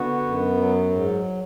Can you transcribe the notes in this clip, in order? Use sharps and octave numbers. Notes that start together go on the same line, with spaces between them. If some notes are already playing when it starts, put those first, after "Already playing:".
Already playing: D3 B3 F#4
F#2
F#3
G#2